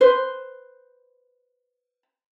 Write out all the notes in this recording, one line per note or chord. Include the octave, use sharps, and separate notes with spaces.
B4 C5